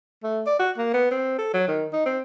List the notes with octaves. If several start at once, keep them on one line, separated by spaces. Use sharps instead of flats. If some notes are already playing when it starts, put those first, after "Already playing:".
A3
D5
F#4
A#3
B3
C4
A4
F#3
D#3
D#4
C4